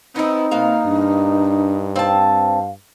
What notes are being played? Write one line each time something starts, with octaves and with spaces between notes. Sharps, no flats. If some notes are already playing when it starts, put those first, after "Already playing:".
B3 C4 D#4 E4
B2 A#3 F5
G2 D4
C4 F5 A5